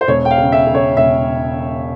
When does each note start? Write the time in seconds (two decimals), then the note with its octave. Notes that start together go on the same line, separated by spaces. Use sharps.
0.01 C5
0.08 E1 C#5
0.25 G5
0.31 F5
0.38 C#3
0.52 E5
0.67 C#3
0.75 C#5
0.97 E1 E5